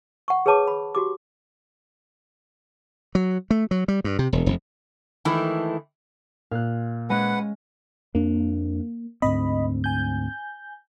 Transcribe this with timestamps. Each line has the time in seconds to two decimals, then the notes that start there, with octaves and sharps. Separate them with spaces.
0.28 F#5 C#6
0.46 G#4 B4 C#5 A5 D6
0.68 B5
0.95 F#4 G4 D6
3.15 F#3
3.51 A3
3.71 F#3
3.88 G3
4.04 G2
4.19 C3
4.33 E1
4.46 F1
5.25 D#3 E3 G#3 A3 E4
6.52 A#2 F5 F#6
7.10 G#3 C#4 G#4 B4 F#5
8.15 F2 A#3 D4
9.22 D2 G#2 C4 D#5 B5
9.84 G#5 G6